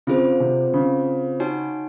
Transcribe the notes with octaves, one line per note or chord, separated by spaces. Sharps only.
C#3 C4 F4 G#4 C5
C3
C#3
D#4 F#4 C#5 G#5